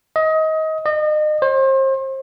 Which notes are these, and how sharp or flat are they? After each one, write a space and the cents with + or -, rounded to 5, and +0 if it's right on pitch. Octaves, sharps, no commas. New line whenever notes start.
D#5 +25
D#5 -35
C5 +35